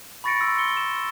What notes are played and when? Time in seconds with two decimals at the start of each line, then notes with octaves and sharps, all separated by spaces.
0.24 B5 C#6 A6 A#6 C#7 D7
0.40 C6 E6 A#6 C#7
0.56 C#7 G7
0.77 E7
0.97 E6